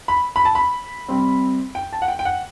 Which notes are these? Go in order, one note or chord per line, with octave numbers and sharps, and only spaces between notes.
B5
B5
A5
B5
C3 G3 C4
G5
A5
F#5
G5
G5
F#5